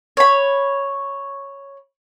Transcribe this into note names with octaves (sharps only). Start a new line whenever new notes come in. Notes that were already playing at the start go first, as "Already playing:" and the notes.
C#5 B5